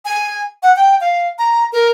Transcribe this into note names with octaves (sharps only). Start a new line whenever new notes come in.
G#5
F#5
G5
F5
A#5
A#4